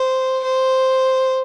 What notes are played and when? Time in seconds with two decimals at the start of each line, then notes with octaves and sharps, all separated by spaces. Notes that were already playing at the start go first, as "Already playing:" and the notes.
Already playing: C5
0.44 C5